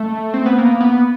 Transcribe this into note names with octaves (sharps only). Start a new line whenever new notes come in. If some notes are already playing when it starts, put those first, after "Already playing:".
Already playing: A3
C4
B3
A#3
B3